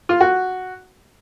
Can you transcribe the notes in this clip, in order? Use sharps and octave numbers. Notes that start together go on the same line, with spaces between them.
F4
F#4